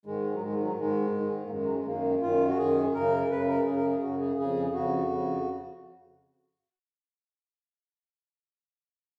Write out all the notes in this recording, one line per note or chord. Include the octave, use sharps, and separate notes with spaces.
G#2 D#3 G#3
F#3
G#2 D#3 G#3
F#3
G#2 D#3 G#3
G#2 D#3
A#3
F#2 D#3 G#3
F#3
G#3
F#2 D#3 A#3
F#2 D#3 F4
F#4
F#2 D#3 G#4
F#2 C#3 A#4
F#2 C#3 B4
A#4
F#2 C#3 G#4
A#4
G#4
F#2 C#3 F#4
G#4
F2 C#3 G#4
F2 C#3 F#4
F2 C#3